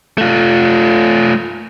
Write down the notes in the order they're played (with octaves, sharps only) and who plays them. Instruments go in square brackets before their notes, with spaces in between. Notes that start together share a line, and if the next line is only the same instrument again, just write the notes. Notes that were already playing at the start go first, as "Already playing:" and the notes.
[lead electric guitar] A3 F4